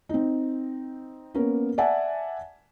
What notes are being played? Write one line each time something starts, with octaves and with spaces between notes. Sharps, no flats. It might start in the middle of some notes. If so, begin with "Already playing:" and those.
C4 D#4
A#3 B3 C#4 A#4
D5 E5 F#5 G#5 A5